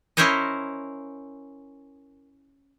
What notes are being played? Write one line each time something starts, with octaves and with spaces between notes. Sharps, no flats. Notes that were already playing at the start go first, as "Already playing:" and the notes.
C#4 E4 A#4 C5 C#5 D#5